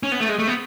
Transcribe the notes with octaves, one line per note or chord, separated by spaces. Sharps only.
C#4
B3
A3
G#3
A3
B3